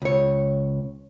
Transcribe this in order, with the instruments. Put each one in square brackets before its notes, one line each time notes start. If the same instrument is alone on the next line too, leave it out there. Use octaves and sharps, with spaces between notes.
[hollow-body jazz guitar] C#2 C#5